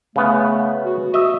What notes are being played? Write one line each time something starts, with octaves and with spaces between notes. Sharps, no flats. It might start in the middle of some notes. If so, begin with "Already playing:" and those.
C#3 A3 B3
F#4
F#4 D#5 E5